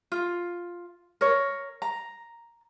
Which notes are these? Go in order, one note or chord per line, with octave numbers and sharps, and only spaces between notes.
F4
A#4 C#5
A#5